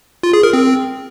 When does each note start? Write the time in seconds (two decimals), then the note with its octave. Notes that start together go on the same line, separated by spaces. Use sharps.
0.23 F4
0.33 G#4
0.43 A#4
0.53 C4